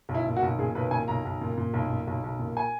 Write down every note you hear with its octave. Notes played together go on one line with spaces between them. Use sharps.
B1
E4
A#2
F#4
B1
A#2 G#4
B1 B4
A#2 G#5
B1 A#5
B1
A#2
A#2
B1
A#2
B1
B1
A#2
G#5